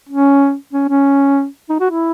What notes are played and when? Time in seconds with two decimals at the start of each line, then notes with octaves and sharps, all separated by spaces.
0.09 C#4
0.73 C#4
0.89 C#4
1.69 D#4
1.80 F#4
1.91 E4